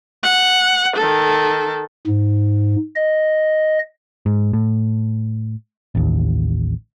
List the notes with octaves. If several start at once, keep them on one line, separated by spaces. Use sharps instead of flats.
F#5
D#3 A4
G#2
D#5
G#2
A2
A1 D#2